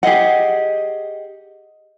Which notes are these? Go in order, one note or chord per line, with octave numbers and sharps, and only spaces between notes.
G4 G#4 D#5 F#5